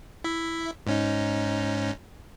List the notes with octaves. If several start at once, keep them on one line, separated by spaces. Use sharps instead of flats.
E4 E5
G#2 C#4 D#4